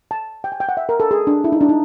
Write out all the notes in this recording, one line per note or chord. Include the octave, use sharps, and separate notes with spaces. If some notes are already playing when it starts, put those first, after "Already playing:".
A5
G5
G#5
G5
F#5
E5
A#4
A4
G#4
D4
E4
D#4
D4
D#4